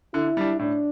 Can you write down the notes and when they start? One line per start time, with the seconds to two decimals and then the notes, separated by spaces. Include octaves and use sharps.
0.14 D3 E4
0.37 G3 D4
0.59 A2 D4